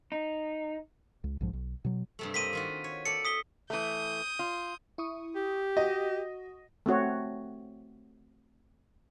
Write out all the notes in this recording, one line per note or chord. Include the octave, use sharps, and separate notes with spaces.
D#4
C#2
B1 G#2 F3
B1
B2 F#3
G2 C3 A3
A#3 C4 D#5 B6 D#7
D#3 F4 F#4
C#5
A4 D5 C#7
D#6 B6 G7
E3 A3 D#6 G6
F4
E4 C#6 D#6
G4
F#4 D#5
A3 C4 F#4 C#5